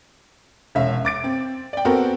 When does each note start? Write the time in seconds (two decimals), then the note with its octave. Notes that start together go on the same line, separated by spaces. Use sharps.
0.75 E1 C#4 E5 F5
1.05 D6 A6 D7
1.24 C4
1.73 D5 G5
1.85 B3 C4 F#4 A4 A#4 C5